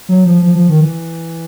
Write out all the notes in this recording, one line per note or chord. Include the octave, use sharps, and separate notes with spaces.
F#3
F3
F3
F3
D#3
E3